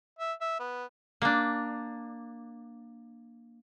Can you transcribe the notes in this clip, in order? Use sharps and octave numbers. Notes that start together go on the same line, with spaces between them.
E5
E5
B3
A#3 D4